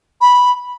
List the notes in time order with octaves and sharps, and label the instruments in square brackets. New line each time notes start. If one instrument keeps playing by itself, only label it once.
[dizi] B5